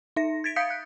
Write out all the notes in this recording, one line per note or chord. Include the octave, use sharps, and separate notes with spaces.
D#4 E5 A#6
G#6 A6 B6 D7
F5 D#6 G6 B6 C#7
F#6